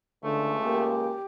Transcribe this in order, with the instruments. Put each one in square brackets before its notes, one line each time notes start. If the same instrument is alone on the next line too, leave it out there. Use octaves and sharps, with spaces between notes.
[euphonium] C#2 [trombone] D3 [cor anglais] A3
[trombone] A#3 [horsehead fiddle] G4